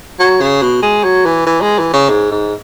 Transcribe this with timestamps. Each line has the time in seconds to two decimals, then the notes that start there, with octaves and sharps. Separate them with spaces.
0.19 F#3
0.41 C#3
0.62 B2
0.82 G#3
1.03 F#3
1.25 E3
1.46 E3
1.61 G#3
1.78 E3
1.93 C#3
2.09 G#2
2.31 G#2